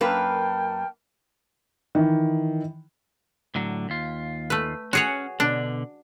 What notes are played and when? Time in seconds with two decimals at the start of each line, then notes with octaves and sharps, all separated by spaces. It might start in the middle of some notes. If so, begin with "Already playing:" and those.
0.01 F#2 A#3 B4 G5 A5 F6
1.95 D#3 E3
3.55 A2 D3 F#3
3.89 D#2 F4
4.50 A3 B4
4.93 C#4 F#4 G#4 C#5 F#5
5.40 B2 D3 D4